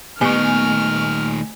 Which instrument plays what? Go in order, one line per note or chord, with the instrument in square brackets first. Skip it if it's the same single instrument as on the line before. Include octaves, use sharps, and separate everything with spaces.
[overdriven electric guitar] A#2 D#3 [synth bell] A3 G#5 [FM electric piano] B3 C#6 [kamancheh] F6